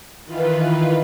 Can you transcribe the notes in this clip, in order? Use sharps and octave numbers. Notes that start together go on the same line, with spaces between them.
D#3 E3 F4 B4